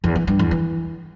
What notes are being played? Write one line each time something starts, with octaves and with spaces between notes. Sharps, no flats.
E2
E3
G2
E2
E3